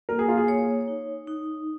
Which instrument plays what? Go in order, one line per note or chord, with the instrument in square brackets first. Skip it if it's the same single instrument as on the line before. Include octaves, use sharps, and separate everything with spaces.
[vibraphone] A#3 [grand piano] A#4
[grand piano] G#4
F4
G#4
[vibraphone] C#5
D#4
D#4